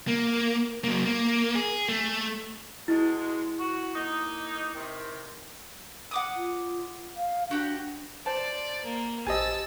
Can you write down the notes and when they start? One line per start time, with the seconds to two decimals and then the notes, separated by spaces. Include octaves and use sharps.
0.08 A#3
0.84 F#3 A#3
1.05 A#3
1.55 G#4
1.89 A3
2.88 B2 G#3 E4
3.60 F#4
3.95 A#3 D#4
4.75 C3 D#3
6.11 F#5 D6 D#6
6.36 F4
7.16 F5
7.51 D4 F#4 G4 F#5
8.26 C5 D5 A5
8.84 A#3
9.27 A1 G4 C5 D#5 G#5 A5 E6